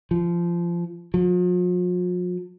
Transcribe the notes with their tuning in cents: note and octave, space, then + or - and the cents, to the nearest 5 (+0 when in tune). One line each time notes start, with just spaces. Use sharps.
F3 -20
F3 +45